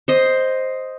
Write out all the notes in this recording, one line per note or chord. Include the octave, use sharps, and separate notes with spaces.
C5 D#5